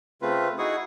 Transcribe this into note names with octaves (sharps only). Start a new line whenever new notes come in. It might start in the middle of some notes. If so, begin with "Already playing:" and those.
C#3 A3 C4 F4 B4
D#4 E4 F#4 G#4 C#6 D#6